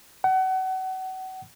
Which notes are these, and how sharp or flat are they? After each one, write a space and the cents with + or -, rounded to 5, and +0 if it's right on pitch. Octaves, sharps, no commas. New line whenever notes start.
F#5 +30